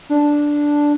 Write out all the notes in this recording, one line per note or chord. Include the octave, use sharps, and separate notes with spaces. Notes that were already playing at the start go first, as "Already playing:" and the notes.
D4